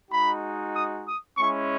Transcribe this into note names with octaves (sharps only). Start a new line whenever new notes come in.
G#3 D#4 F#4 B5
D#6
D#6
G#3 C#4 E4 C#6